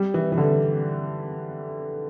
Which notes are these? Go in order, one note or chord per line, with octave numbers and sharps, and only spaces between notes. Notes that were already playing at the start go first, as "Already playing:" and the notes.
Already playing: G3
E3
E3
D3